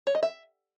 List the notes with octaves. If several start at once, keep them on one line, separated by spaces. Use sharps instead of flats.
C#5
D#5
E5